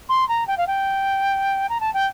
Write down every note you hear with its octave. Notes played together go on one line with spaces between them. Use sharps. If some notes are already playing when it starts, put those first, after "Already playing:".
C6
A#5
G5
F5
G5
A#5
A5
G5